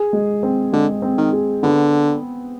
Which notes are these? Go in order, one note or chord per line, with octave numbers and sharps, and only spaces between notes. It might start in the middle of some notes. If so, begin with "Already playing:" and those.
Already playing: G#4
G#3
C4
D3 G#3
C4
D#3
G#4
D3 B3